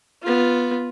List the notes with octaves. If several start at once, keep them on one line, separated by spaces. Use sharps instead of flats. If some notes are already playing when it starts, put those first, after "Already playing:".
B3 F4